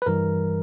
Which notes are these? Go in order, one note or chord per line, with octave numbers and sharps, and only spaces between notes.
B4
G2 E3 G3 A#4